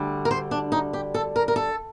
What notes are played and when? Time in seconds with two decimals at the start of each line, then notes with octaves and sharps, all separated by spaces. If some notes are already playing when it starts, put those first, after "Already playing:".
Already playing: D2 D3 G3
0.25 A#4
0.31 C5
0.51 D4
0.72 D#4
0.93 G4
1.14 A4
1.36 A#4
1.48 A#4
1.56 A4